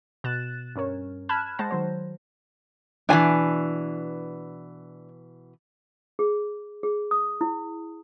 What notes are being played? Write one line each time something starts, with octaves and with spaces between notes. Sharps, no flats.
B2 F#6 A6 E7
G2 C#4 A#4 C#5
A5 B5 F6 F#6 G#6 E7
G#3 C5 F#5 A5 A#6
D#3 F#3 C5
B2 D#3 E3 D4 G#5
G#4
G#4
D#6
E4